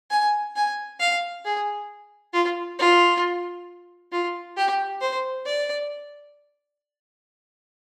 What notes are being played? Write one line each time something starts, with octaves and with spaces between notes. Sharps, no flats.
G#5
G#5
F5
G#4
F4
F4
F4
G4
C5
D5